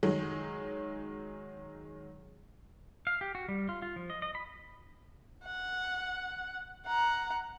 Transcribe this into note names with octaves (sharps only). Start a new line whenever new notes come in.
D#3 F#3 G#3
F5
G4
F#4
G3
F4
F4
F3
D#5
D#5
B5
F#5
F#5 A#5